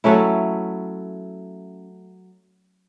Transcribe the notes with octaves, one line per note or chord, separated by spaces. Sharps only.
F#3 A3 C#4 E4